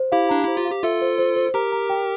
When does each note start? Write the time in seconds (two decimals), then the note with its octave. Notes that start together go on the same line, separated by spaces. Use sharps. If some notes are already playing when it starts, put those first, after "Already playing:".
Already playing: C5
0.12 E4 G4 F5
0.29 D4 A#5
0.44 E4 C5
0.57 F4
0.65 F5
0.71 G4
0.83 F4 A4 E5
1.02 C5
1.18 C5
1.36 C5
1.54 G4 A#4 A#5
1.72 A#5
1.90 G5